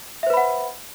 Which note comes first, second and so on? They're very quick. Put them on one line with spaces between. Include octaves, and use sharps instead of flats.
E5 C5 B4 B5 F#5